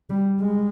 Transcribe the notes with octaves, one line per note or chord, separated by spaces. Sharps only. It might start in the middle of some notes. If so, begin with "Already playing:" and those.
G3
G#3